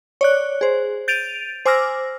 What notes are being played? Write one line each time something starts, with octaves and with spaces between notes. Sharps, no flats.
C#5 D5 F#6
G#4 C5
G6 A6 D7 D#7 F7
C5 G#5 D6 E6 F6 A#6